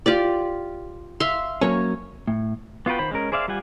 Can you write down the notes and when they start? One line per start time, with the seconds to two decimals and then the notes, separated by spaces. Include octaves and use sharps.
0.06 F4 G4 D5
1.20 E5 F5 C6
1.61 F#3 A#3 C#4 C#5
2.28 A2
2.86 B3 F4 F#4 B4 G5
2.99 D#3 C5 B5
3.11 G#3 C#4 A#4
3.32 G#4 C5 D5 E5 F5
3.48 G3 F4 G4 F#5 G#5